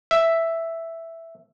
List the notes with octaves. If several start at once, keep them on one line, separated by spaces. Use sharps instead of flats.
E5